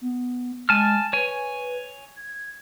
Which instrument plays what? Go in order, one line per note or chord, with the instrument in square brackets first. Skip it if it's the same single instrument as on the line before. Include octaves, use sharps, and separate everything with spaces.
[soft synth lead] B3
[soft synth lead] G#3 [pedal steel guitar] G#5 A5 F6
[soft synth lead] B4 [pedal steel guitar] C#5 G#5
[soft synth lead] G#6